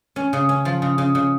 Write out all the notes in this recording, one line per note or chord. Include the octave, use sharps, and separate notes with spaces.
C#4
C#3
C#4
F3
C#3
C#3
C#3